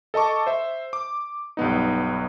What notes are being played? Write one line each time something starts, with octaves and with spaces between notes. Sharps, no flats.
A4 D#5 A5 C#6 D6
C5 E5
D6
B1 G2 B3 D#4